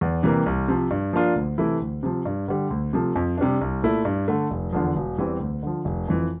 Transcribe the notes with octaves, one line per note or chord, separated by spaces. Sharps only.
E2
C3 E3 G3 A#3
C2
C3 F3
G2
F3 A#3 D4 F4
D2
C3 E3 A3 E4
D2
C3 F3
G2
D3 G3
D2
C3 F3 A3
F2
C3 G3 D4
C2
A#2 A3 E4
G2
D3 A3
F1
E2 D3 F3
E1
E2 E3 G3 C4
D2
D3 F3
F1
F2 E3